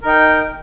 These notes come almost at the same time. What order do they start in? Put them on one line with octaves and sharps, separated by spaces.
A#4 D#4 G5